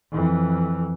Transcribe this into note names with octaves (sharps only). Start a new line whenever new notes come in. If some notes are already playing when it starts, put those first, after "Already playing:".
F2 E3